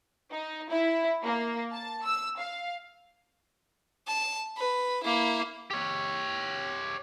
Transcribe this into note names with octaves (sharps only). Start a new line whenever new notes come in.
D#4
E4
A#3
A5
E6
F5
A5
B4
A#3 E4
G4 C#5